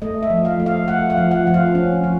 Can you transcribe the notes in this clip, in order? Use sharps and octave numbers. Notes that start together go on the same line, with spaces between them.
A3 D#5
E5
F3
F5
A3
F5
A3 F#5
F5
F3
F#5
F3
F5
C#4
F3